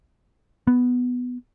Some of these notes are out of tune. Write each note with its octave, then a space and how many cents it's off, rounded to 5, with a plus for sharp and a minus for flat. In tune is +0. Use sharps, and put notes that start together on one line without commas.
B3 +5